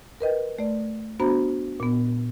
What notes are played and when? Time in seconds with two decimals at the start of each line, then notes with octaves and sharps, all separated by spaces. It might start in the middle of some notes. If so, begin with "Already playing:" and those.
0.21 A#4 B4 D#5 G5
0.59 A3 D5
1.20 B3 D4 F#4 C5 A#5 B5
1.80 A#2 B3